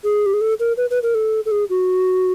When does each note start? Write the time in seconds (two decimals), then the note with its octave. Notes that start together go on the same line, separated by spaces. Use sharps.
0.04 G#4
0.26 G4
0.34 G#4
0.41 A4
0.60 A#4
0.77 B4
0.90 B4
1.03 A#4
1.15 A4
1.46 A4
1.51 G#4
1.70 F#4